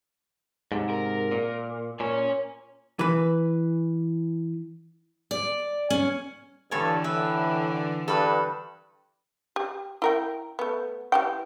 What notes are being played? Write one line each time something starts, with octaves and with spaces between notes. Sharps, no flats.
G#2 C3
A#4
A#2
A#2 C#5 G#5
E3 B4
D5
C#4
G2 D3 E3 A4 C#5 G#5
A2 B4 E5
G2 A4 B4
G4
E4 A#4 G5
A3 B3
E3 G4 G5